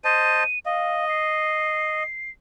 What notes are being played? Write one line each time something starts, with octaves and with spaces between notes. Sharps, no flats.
C5 D#5 A5 D#7
D#5 F5
C7